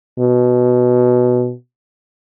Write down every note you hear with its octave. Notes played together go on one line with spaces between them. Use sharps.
B2